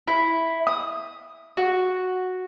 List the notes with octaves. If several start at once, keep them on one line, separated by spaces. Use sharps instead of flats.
E4
D#6
F#4